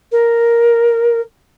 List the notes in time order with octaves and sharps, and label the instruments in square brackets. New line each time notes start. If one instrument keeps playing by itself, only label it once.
[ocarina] A#4